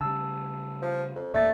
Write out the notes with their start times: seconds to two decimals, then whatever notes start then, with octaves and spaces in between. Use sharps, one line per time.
0.01 C#3 G3 A5 E6
0.82 F3
1.15 F2
1.34 E1 A#2 A3 A#3 D5 A6